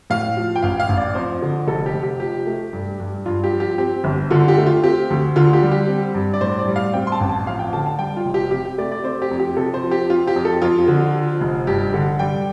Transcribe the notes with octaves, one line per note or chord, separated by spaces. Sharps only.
A2 F5
F3
G5
A1 F5
F5
A1
D5
F2 C5
D3
F1 A4
G4
F1
G4
F3 G4
A3
G2
G2
G2 F4
G4
F3
G4
C4 G4
G1
D3 F4
G4
A3
F4
C4 G4
D2
D3 F4
G4
G3
G4
C4
G2
D5
A2 C5
D5
G3
F5
C4 G5
C6
A5
A1
A5
F2 F5
G5
D3 A5
A5
G3 G5
F4
F1
G4
C3 G4
G4
A3 D5
D5
C4 C5
G4
F2
G4
C3 A4
C5
F3
G4
C4 F4
G4
F2
A4
F2 F4
D3
F3
F1
G2 G4
D3
G3 G5